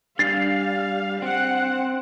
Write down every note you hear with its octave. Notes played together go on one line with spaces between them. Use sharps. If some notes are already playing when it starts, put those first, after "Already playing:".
G3 D4 F5 A6 C7
C4 F#5